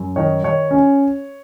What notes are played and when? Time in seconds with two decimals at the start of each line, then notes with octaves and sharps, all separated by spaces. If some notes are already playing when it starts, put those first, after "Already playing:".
Already playing: F#2
0.16 D#3 C#5
0.44 D#3 C#5
0.71 C#4